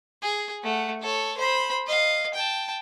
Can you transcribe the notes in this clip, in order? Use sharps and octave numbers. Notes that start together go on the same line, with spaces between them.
G#4
A3 F#5
A4 C#5
C5 B5
D#5 F5
G5 A5